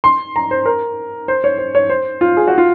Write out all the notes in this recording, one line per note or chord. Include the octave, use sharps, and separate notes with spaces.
C6
A#5
C5
A#4
C5
C#5
C5
C#5
C5
F4
G#4
F#4
F4